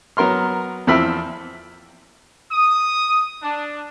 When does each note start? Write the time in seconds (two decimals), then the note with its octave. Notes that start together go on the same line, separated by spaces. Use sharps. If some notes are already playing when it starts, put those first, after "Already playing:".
0.17 F#3 B3 A#4 C6 F6
0.87 E2 F3 C4 B5 E6 F6
2.52 D#6
3.42 D4